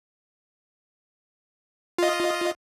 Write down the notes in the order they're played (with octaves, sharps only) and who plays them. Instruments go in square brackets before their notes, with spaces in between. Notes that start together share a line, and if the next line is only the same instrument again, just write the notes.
[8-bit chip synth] F4 D#5